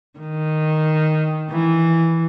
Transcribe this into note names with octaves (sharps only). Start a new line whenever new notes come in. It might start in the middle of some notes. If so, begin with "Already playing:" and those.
D#3
E3